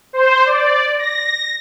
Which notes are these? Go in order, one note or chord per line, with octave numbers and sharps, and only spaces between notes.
C5
D5
A#6